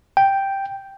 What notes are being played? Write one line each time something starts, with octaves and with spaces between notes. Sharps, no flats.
G5